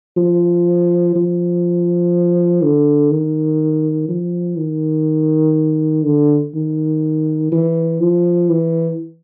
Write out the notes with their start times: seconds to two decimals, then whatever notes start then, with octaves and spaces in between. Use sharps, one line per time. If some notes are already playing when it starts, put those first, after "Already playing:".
0.17 F3
1.15 F3
2.62 D3
3.11 D#3
4.09 F3
4.58 D#3
6.05 D3
6.55 D#3
7.52 E3
8.01 F3
8.50 E3